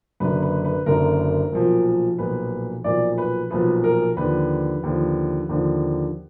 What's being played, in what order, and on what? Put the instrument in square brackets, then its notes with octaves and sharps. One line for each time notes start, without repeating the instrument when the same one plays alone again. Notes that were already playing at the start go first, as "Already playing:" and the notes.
[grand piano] F#1 F#2 D3 B4
B4
B4
F#1 F#2 D3 A#4
B1 A#2 F3
B1 A#2 F3 B4
B1 A#2 F3 D5
B4
B1 A#2 F3 B4
A#4
D#2 D3 F3 B4
D#2 D3 F3
D#2 D3 F3